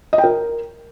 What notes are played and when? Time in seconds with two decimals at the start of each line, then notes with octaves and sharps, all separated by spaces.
0.13 D#5
0.18 G5
0.24 A#4